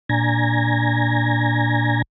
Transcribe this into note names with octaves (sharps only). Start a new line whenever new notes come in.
A#2 D4 G#5 A#5 G#6 A#6